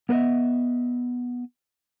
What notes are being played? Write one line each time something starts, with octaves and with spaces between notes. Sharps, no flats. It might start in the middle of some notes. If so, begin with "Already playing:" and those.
B3 A#4 B4 D#5 E5